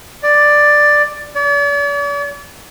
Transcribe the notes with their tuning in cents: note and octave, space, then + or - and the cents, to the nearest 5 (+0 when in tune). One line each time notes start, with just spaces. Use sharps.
D5 +5
D5 -45